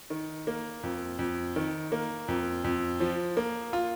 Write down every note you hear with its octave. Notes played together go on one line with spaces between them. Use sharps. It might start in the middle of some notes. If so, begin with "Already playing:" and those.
D#3
A#3
F2
F2
D#3
A#3
F2
F2
F3
A#3
F4